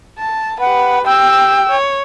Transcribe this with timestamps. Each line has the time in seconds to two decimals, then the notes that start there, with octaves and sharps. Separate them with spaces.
0.19 A5
0.60 G4 B4 F#5
1.05 G4 G5 E6
1.69 C#5